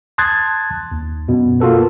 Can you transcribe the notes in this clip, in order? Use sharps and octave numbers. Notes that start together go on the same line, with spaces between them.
A5 C6 D#6 F#6 G#6 A6
D#2
F#2 B2
A#3 F4 F#4 A4 B4